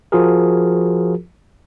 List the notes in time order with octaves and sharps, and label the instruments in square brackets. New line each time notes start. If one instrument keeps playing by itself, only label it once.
[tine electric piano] F3 F4 F#4 G#4 A#4